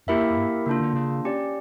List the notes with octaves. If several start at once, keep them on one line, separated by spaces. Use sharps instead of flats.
F2 A#3 E4 G4 A#4 E5
F2
G2
C#3 A#3 D4 F4
D3
C#3
C#4 G4 D5